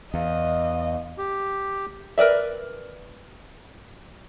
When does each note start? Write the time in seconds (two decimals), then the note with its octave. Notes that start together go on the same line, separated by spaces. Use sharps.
0.14 E2 D#5 F5
1.18 G4
2.18 A#4 B4 D5 E5